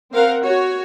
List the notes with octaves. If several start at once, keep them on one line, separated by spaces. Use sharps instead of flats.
C4 A#4 F5 F#5
F#4 C#5